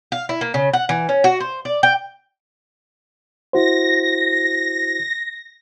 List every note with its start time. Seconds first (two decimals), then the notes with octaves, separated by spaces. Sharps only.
0.12 F5
0.29 E4
0.41 A#3
0.54 C#3
0.73 F#5
0.89 E3
1.09 C#4
1.24 F#4
1.40 C5
1.65 D5
1.83 G5
3.53 E4 F#4 C5 A#6